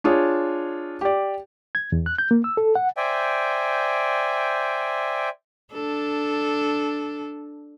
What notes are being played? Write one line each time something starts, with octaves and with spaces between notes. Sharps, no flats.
D4 F4 G#4 C#5
G4 D5
G#6
E2
F#6
G6
A#3
E6
A4
F#5
C5 D5 E5 G5 G#5
D4 A4